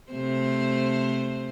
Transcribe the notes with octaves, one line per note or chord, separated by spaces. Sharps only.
C3 A3 C5